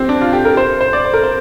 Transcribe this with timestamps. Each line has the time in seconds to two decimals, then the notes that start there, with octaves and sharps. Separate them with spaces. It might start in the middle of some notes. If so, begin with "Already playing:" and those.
Already playing: C4 G4
0.09 D4
0.21 F4
0.33 G4
0.45 A#4
0.57 C5
0.81 C5
0.93 D5
1.05 C5
1.14 A#4
1.23 C5